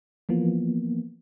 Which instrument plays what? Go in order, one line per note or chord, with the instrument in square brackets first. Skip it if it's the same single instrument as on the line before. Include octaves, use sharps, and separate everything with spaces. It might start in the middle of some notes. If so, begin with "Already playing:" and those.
[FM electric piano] E3 F3 A#3 B3